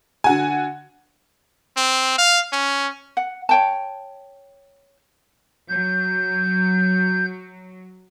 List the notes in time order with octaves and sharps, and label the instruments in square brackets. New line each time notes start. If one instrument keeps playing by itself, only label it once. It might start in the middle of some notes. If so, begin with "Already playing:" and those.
[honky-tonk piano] D3 F#4 G#5
[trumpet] C4
F5
C#4
[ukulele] F#5
C#5 G5 A5
[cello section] F#3 [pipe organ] G6